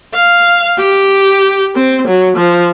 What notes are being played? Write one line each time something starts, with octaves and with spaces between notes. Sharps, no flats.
F5
G4
C4
F#3
F3